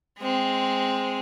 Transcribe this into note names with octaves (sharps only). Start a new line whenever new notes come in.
G#3 C4